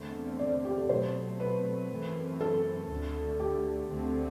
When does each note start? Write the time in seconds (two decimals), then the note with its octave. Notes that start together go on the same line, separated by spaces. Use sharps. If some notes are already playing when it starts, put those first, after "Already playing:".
Already playing: E2 D3 A3 C4
0.39 D5
0.65 G4
0.77 A4
0.89 B2 F#3 A3 C4 C5
1.40 B4
1.90 F#2 E3 A3 C4
2.41 A4
2.90 D2 D3 A3
3.40 G4
3.90 D2 D3 A3 C4